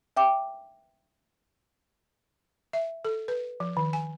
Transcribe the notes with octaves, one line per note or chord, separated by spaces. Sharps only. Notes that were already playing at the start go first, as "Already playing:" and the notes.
E5 G5 D6
E5
A4
B4
F3
D#3
G#5